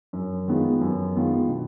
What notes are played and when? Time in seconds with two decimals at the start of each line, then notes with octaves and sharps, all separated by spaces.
0.13 F#2
0.47 D#3 G#3 B3 F4
0.81 F#2
1.16 D#3 G#3 B3 F4
1.49 B2